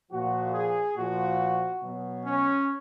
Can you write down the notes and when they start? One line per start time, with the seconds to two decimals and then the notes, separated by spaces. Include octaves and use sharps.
0.12 A#2 F3 F#4
0.53 G#4
0.96 A#2 F3 F#4
1.82 B2 F#3
2.25 C#4